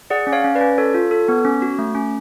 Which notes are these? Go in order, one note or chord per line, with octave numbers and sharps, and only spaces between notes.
G#4 D5 F#5
C#4
C#5 F5
C#4
B4 D5
C#4
A4 C#5
F4
A4
B3
C#4
F#4
A3
C#4